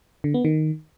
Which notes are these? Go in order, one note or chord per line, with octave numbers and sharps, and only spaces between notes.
D3
B3
D#3